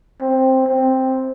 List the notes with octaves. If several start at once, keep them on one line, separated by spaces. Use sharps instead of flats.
C4
C4